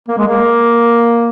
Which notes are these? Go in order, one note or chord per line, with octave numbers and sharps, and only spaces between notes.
A#3
G#3
A#3